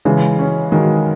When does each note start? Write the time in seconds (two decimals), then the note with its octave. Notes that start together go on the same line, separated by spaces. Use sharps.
0.05 C#3 E3 G#3
0.39 C#4
0.72 D#3 F#3 G#3